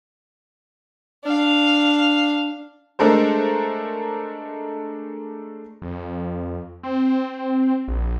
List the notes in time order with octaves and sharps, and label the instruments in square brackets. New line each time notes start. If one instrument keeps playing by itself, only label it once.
[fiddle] D4 F5
[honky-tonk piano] G#3 A3 D4 A4 A#4 C5
[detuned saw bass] F2
C4
A#1